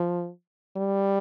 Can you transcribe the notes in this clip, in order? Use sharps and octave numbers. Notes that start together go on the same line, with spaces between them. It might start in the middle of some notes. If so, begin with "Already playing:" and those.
Already playing: F3
G3